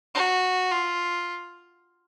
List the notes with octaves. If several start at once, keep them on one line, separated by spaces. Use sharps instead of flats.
F#4
F4